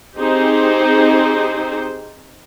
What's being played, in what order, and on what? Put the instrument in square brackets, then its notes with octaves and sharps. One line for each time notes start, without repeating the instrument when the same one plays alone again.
[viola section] C4 D#4 G4 G#4 C5